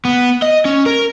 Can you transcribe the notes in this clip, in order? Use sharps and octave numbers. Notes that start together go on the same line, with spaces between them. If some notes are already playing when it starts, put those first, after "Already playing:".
B3
D#5
C#4
A#4